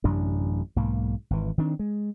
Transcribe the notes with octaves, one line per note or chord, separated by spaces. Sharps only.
A1 F#2 C3 D4
B1 G#2 A#3
G#1 E3
D#3 C4 D4
G#3